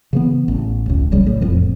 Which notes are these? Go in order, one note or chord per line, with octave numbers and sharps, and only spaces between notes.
C#3 E3 B3
A1
E1 C#2
D#1 B1 C#3 G3
A2
E1 F2 A2 F3